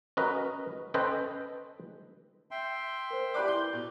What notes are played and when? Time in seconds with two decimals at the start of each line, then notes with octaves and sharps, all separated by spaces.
0.17 C#4 F#4 A#4 B4 D#5
0.94 C#4 A4 B4 C5 D#5 G5
2.51 E5 G5 C6
3.10 A#4 C5
3.34 G4 B4 D5 D6 F#6
3.48 E4 C6 G6 G7
3.73 B2